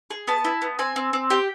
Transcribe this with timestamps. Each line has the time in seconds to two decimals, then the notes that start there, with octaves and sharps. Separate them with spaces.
0.11 G#4
0.28 B3 A5
0.45 E4
0.62 B3
0.79 C4 G#5
0.96 C4
1.13 C4
1.30 G4 G5